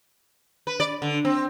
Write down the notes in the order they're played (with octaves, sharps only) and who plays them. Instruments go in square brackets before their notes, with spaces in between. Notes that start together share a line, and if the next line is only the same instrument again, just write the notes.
[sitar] B4
D5
D3
C4